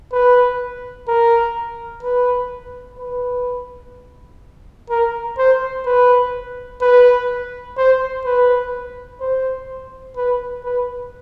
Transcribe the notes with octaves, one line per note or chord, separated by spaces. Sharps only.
B4
A#4
B4
B4
A#4
C5
B4
B4
C5
B4
C5
B4
B4